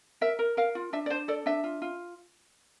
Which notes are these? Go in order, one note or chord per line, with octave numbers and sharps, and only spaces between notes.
A#4 E5
A#4
A#4 F5
F4
D4 E5
D5
D4 C5
A4 D5
D4 E5
F4
F4